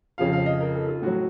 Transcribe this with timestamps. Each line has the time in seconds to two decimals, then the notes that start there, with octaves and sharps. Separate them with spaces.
0.18 F2 C#3 F3 F5
0.33 F5
0.46 D#5
0.61 A#4
0.75 A4
0.88 F4
1.02 A2 F#3 F#4